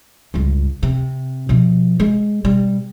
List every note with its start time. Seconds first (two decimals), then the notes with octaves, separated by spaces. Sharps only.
0.34 C#2 G2
0.83 C3
1.49 B2 F3
2.00 G#3
2.44 B2 G3